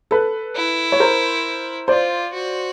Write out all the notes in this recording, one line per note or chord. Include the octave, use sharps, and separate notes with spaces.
A4 B4
E4
C#5
A#4 C5
F4 C5 D5
F#4